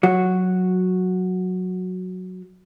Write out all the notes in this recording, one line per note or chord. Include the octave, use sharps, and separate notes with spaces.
F#3 F#4